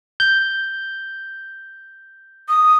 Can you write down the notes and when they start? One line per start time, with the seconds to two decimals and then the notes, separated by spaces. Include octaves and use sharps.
0.20 G6
2.49 D#6